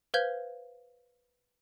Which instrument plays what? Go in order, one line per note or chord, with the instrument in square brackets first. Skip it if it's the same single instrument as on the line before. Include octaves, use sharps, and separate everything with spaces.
[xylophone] B4 C5 F5 G6 G#6